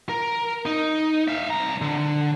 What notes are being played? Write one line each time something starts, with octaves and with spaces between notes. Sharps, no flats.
A#4
D#4
E5 F5
C2 A#5
D3